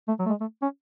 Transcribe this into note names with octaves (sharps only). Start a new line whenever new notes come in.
A3
F#3
A3
G#3
A3
C#4